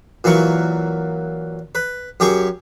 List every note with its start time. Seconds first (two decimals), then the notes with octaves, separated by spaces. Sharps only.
0.24 A#2 E3 F#3 C#6
1.75 B4
2.20 F#2 G4 G#4 C#6